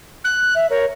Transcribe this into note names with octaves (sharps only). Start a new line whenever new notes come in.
F#6
E5
A#4 C#5